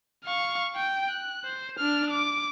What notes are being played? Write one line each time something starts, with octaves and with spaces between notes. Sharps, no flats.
F5 C#6
G5
F#6
C5
D4 F6
D6